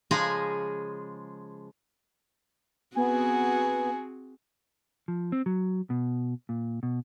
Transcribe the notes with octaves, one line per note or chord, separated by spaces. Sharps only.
C#3 F3 G#3 G#4 G#5 A#5
B3 C4 F#4 G#4 G#5
F3
C4
F#3
B2
A#2
B2